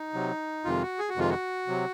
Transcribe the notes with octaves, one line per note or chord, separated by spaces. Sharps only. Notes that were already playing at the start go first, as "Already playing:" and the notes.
Already playing: D#4
C3 F#3
F2 C3 D#3 G#3 F4
F#4
G#4
F#4
F2 C3 D#3 G#3 F4
F#4
C3 F#3